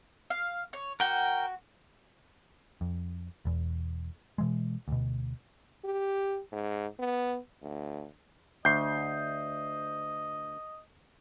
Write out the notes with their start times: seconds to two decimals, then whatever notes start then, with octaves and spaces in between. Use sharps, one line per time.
0.30 F5
0.73 C#5
1.00 F#4 A#4 G5
2.81 F2
3.45 E1 E2
4.38 B2 E3 G#3
4.88 D2 B2
5.85 G4
6.52 G#2
6.99 B3
7.62 D2
8.65 D2 D#5 G6 C7